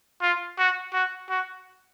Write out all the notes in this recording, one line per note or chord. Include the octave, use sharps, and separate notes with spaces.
F4
F#4
F#4
F#4